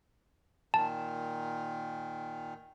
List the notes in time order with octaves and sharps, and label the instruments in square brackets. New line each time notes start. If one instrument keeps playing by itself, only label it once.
[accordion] A#2 D#3 [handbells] A5